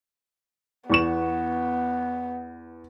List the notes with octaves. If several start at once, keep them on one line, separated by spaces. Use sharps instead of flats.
E2 B3 C#6 E7